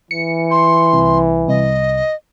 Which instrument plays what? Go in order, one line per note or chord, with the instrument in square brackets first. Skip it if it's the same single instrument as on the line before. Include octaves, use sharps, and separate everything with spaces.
[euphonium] E3 [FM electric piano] C#7
[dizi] C6
[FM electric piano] C2
[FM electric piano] C2 [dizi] D#5